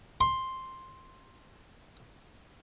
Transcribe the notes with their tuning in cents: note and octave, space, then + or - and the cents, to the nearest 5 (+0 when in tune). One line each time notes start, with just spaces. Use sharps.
C6 +5